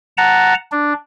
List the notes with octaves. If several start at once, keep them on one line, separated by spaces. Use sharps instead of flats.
F#5 A5 A#5
D4